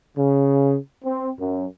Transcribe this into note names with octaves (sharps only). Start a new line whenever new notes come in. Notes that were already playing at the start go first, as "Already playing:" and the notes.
C#3
C4
F#2